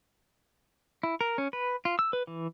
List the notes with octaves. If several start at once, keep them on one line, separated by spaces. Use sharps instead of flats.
E4
A#4
C#4
B4
F4
E6
B4
E3